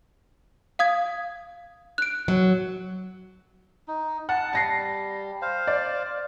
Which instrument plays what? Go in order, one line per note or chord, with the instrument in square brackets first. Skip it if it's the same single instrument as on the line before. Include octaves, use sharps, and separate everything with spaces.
[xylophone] F5 D#6 G#6
F#6 D7
[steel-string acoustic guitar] F#3
[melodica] D#4
[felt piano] F#5 [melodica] A5
[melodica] G3 [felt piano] A5 A#6 C7
[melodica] C5 F5
[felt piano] D5